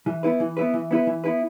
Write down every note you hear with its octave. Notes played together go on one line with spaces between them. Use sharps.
E3
B3 E4 B4
E3
B3 E4 B4
E3
B3 E4 B4
E3
B3 E4 B4